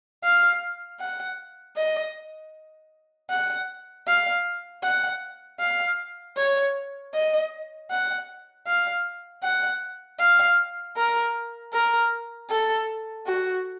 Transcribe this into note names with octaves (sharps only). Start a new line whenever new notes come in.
F5
F#5
D#5
F#5
F5
F#5
F5
C#5
D#5
F#5
F5
F#5
F5
A#4
A#4
A4
F#4